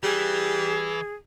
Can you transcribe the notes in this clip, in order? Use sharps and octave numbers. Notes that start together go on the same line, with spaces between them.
E3 G3 G#4